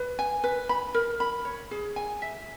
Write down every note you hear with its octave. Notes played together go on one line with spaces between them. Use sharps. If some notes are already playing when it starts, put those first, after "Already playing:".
Already playing: B4
G#5
B4
B5
A#4
B5
C#5
G#4
G#5
E5